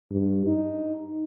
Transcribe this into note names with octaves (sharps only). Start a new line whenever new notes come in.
G2
D#4